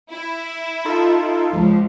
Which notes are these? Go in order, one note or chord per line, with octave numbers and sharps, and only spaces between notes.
E4
D#4 F4 A4
C#2 F3